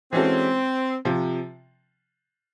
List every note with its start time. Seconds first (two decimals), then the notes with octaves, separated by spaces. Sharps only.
0.13 E3 G#3 C4 C#4 F#4 A4
1.05 C3 F3